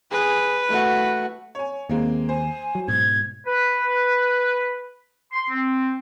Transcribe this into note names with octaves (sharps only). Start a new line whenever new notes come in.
G#4 B4
A3 F#4
C#5 G#5
D#2 G#3 A#3 C4
C5 G#5
F#3
G#2 B2 G#6
B4
C6
C4